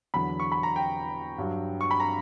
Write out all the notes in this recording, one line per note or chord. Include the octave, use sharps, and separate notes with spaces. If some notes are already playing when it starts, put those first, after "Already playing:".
E2 D3 F#3 B5
C#6
B5
A#5
G5
G2 F#3
C#6
B5
A#5